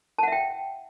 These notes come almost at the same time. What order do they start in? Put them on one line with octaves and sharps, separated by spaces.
A5 F#5 E5 G5